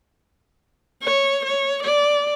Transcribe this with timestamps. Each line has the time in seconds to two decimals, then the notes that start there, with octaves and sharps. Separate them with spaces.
1.03 C#5
1.45 C#5
1.83 D5